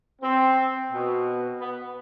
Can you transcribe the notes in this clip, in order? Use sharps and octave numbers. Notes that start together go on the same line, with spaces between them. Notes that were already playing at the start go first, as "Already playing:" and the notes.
C4
B2
B3